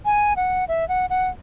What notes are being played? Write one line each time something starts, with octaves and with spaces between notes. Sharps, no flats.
G#5
F#5
E5
F#5
F#5